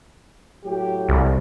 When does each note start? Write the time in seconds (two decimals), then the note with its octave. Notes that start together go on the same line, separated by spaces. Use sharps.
0.64 A2 F#3 G4
1.09 C2